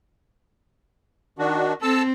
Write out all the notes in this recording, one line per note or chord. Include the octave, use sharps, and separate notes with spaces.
D#3 D4 F#4
C4 A4 A5 E6